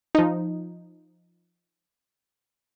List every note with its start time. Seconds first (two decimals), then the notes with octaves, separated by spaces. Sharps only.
0.15 F3 D#4